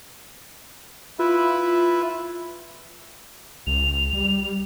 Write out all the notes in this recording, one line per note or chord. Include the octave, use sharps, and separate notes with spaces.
E4 F4 B4 E5
C#2 F7
G3